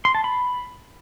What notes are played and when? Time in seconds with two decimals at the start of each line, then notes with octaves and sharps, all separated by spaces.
0.05 C6
0.15 A5
0.24 B5